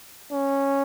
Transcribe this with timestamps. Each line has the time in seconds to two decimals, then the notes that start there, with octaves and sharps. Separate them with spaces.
0.32 C#4